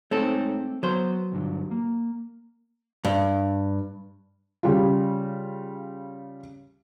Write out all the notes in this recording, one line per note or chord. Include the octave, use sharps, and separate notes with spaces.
G#3 A3 C4 D#4 A4 C#5
F#3 B3 C5
D2 G2 D3
A#3
G2
C#3 G3 F4